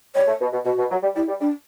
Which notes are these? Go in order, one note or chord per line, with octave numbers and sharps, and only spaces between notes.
G3 C#5
A3
B2
B2
B2 F#4
B2
F#3
G3
G3 E4
G3
G3 D4